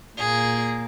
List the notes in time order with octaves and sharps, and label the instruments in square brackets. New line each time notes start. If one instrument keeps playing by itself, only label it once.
[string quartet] A#2 A#3 G#4